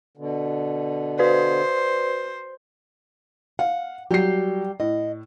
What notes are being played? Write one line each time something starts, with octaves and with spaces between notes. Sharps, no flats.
B2 D3
F#4 B4 C5 D5
F5 F#5
F#3 G3 G4 C7
A2 D#5